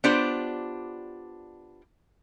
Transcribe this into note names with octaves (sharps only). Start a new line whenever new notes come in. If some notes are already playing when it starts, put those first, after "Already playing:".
B3 D4 F4 G4 C5 D5